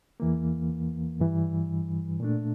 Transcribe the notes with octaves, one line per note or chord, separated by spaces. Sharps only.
E2 E3 A#3
G2 E3 G3
A#2 A3 D4